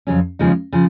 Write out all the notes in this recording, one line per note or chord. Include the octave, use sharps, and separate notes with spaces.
F2 C#3 F#3 C#4
D#2 C#3 F3 G#3 D#4
C#3 F3